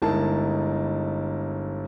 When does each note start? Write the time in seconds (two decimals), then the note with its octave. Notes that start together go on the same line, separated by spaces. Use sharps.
0.02 G1 G#3 D#4 E4 A#4 A5